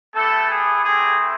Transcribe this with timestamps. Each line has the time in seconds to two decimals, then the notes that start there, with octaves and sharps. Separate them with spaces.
0.15 A3 B3 E4 G4 A4
0.50 G#4
0.84 A3 C4 E4 G4 G#4